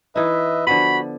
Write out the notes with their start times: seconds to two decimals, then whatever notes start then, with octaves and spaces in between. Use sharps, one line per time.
0.16 E3 D#4 B4 D#5 E5
0.67 D3 F3 B3 F#4 B5